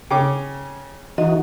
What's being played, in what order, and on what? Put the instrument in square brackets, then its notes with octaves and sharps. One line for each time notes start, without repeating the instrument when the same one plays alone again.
[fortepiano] C#3 C#4 D6 [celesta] G5
[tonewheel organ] E3 D#4 F#4 [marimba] D#5